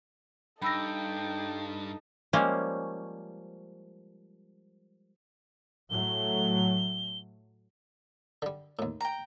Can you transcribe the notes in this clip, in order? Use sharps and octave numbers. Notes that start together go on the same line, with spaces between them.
G2 D#4 A4 G5 B5 E6 A#6
F3 G3 G#3 A#3 C#4
A2 F#3 A3 G7
D3 G3
D#2 A2
G5 A#5